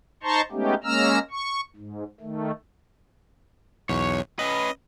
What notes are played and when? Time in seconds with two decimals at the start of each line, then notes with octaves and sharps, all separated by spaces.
0.23 D#4 C5 A5 A#5 C6 C#6
0.52 G#3 A3 B3 C#4 D#4 G4
0.84 G#3 A#3 C#4 A#5 E6 F6
1.31 C#6
1.76 G#2
2.20 D#3 A3
3.89 B1 E2 C#5
4.39 C#4 B4 D#5